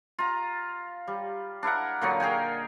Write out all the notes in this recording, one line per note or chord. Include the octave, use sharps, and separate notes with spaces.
F4 A#5
G3
D4 E4 A#4 F#5
A#2 D3 F#3 D#4
G#4 A#4 G5 G#5